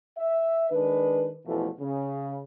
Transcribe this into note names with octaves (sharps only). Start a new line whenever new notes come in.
E5
D#3 G#3 D4 B4
A1 E2 B2 E3 F3 A3
C#3